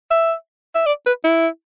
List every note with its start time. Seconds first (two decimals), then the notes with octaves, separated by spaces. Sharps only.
0.11 E5
0.75 E5
0.86 D5
1.06 B4
1.24 E4